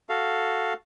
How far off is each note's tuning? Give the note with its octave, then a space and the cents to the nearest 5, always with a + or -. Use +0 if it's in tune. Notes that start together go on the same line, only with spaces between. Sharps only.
F#4 +0 A4 +0 F5 +0